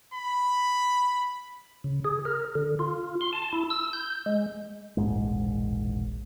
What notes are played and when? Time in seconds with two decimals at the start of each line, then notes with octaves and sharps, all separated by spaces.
0.14 B5
1.84 C#3
2.05 G#4
2.25 A#4
2.55 D3
2.79 F4
3.21 C6
3.33 A5
3.53 E4
3.70 E6
3.93 G6
4.26 G#3
4.97 E1 A#1 G#2 G#3